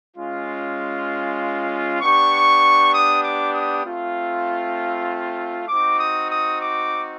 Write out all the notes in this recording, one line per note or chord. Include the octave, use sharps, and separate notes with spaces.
G#3 C#4 F4
B3 D4 G4 C#6
D#6
D6
D#6
A3 C4 F4
C4 D#4 F#4 D6
D#6
D#6
D6